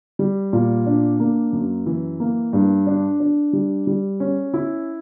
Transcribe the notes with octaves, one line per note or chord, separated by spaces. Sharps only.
G3
A#2
D4
A#3
F#2
E3
A#3
G2
D4
D4
G3
G3
C#4
E4